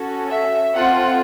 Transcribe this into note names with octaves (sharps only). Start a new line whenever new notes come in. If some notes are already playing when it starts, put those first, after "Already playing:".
Already playing: C#4 F#4 A4
E5
C4 F4 A4 F#5